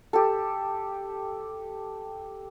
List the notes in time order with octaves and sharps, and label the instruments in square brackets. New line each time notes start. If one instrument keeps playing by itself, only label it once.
[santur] G4 A4